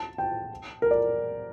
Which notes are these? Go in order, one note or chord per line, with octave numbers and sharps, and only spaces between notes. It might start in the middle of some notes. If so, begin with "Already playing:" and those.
Already playing: A5
G5
A#4
D5